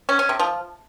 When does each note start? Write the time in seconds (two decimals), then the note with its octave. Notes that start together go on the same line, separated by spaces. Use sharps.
0.09 C#4
0.19 C#4
0.29 C3
0.39 F3